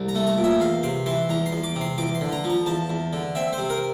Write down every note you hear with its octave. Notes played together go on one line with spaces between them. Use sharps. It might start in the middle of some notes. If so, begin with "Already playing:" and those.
Already playing: C2
A#5
A3
A#5
A#2
E5
E2 F5
C3 C6
E3 C6
E2 A#5
C6
E2
D6
C3
C6
E2 D6
C6
D3
A#5
F3
A#5
E2 A5
E2
D3
C4 E5
C5
C3
A#4